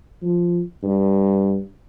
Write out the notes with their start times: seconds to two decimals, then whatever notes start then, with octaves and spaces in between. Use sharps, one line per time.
0.22 F3
0.83 G2